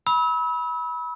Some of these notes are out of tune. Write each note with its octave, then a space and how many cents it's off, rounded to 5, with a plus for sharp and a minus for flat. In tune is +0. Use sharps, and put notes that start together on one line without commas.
B5 -20 E6 -35